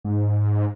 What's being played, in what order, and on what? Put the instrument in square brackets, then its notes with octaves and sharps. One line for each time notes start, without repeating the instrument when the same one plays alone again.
[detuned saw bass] G#2